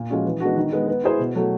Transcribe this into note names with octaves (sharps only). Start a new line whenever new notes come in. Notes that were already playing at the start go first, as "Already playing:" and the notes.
Already playing: A#2
F3 G#3 C#4 F#4
E3
G#3 B3 D4 F#4
D#3
G#3 B3
B3
E4 G#4 C5
B2
F#3 A3